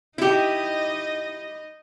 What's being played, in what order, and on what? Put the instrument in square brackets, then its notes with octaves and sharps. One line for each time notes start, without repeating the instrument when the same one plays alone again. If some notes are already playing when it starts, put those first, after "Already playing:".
[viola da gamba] D#4 D#5 [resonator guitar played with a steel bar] E4 G4